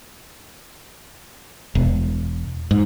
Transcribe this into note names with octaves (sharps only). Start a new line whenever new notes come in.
E1
G#2